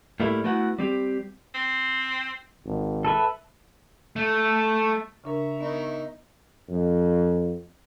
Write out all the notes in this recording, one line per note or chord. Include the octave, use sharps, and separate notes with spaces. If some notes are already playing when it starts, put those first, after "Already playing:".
A2 G3 A3 A#3 E4
A3 B3 E4 F#4 F#5
G3 C4 G4
C4
G#1
A4 B4 E5
A3
C#3 D4 A#4 E5 A#5 C#6
B3 D#4 A#4
F2